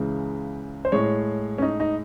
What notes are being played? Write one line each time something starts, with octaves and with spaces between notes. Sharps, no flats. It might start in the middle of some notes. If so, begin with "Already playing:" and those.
Already playing: C#2 C#3 E3 G#3
C5
A2 G#3 C#5
C#4
D#4
D#4